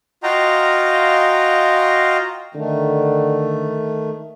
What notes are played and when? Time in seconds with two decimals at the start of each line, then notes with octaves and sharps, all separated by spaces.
0.23 F4 F#4 D#5 F5 G5 A#5
2.55 D3 D#3 A3